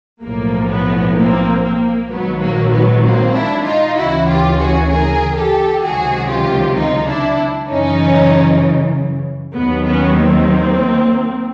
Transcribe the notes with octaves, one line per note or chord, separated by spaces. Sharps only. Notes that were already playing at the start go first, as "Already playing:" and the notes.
B1 A2 F3 A#3
B3
A#3 C4
A#3
A#1 G#2 D#3 F#3 B3
A#3
B3
A#3 C4
D4 E4
D#4 F4
D2 C#3 E3 E4 F#4
F4 G4
F#4 G#4
G#4 A#4
G4 A4
C#2 C3 D#3 F#3 F#4 G#4
F4 G4
D#4 F4
D4 E4
F#2 C#3 E3 C#4 D#4
D#2 D#3 F#3 B3
B3 C#4
A#3 C4